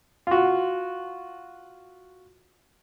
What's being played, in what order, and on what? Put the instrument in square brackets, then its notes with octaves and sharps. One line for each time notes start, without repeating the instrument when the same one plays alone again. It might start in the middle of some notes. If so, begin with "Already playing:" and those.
[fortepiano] F4 F#4